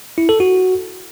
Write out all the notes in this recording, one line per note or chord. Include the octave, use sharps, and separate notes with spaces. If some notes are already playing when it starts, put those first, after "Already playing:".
E4
A4
F#4